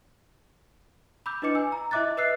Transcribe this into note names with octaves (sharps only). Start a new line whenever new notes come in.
B5 D6 E6 G6
D4 E4 B4 D#5 D6 C#7
G#5 E6
A#5
E4 D#5 E5 D6 F#6 A6
B4 D#5 E5 E6 F#6 C7